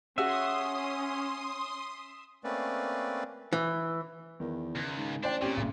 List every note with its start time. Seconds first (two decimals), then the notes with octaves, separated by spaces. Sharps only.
0.18 C#4 F#4 G#4 E5 F#5 C6 D#6
2.44 A3 A#3 C4 C#4 B4 D5
3.53 E3
4.40 E2 D#3
4.76 C#2
4.97 G#2
5.24 A1 D4 C5 D5 G5
5.42 A#2 C4 C#4 G4
5.57 D#1 C#3